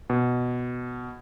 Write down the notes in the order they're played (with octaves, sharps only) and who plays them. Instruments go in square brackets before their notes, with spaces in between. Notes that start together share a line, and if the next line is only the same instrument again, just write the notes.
[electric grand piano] B2